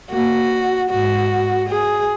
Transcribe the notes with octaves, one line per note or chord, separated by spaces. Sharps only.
A#3 F#4
G#2 F#4
G#4